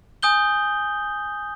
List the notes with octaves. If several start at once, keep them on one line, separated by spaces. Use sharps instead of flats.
G#5 D#6 G6 G7